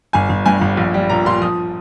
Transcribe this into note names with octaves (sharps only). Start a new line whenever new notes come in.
G1 G#5
G1
G2 G#5
G1
A#1
G3
A#2 A#5
A#2 C6
F3 D#6